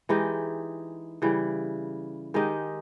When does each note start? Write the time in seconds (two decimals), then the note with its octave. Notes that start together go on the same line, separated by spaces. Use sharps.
0.09 E3 G#3 D#4 G4
1.22 C#3 E3 G3
2.34 D#3 G#3 D#4 G4